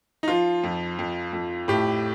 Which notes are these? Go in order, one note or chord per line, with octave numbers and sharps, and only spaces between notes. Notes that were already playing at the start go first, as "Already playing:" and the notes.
D#4
F3 F4
F2
F2
F2
A2 G4